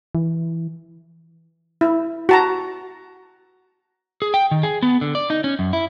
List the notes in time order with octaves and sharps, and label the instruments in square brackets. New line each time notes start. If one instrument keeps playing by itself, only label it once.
[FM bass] E3
[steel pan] E4
F#4 A5 A#5
[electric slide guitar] G#4
G5
D#3
G#4
B3
D3
D5
D#4
C#4
F#2
E4